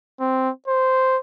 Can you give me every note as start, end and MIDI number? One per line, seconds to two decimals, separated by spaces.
0.20 0.50 60
0.68 1.17 72